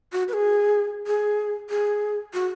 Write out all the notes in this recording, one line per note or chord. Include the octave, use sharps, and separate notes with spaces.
F#4
B4
G#4
G#4
G#4
F#4